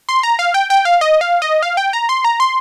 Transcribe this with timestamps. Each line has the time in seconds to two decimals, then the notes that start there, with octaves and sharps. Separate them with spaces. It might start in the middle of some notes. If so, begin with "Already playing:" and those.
0.09 C6
0.23 A#5
0.39 F5
0.54 G5
0.70 G5
0.85 F5
1.01 D#5
1.21 F5
1.42 D#5
1.63 F5
1.77 G5
1.93 A#5
2.09 C6
2.24 A#5
2.40 C6